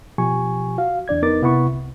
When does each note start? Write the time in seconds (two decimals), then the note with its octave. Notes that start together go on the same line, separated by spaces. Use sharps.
0.18 B2 F3 G4 G#5 C#6
0.78 F#4 F5
1.08 E2 D4 D5 G#6
1.22 F2 B3 D#4 A#4 D6 A6
1.42 C3 B3 E4 F#5 B5 C#6
1.66 C2